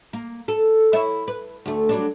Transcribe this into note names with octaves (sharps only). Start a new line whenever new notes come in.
A#3
A4
E4 C#5 E5
B4
D2 A3
F#3 G3 D4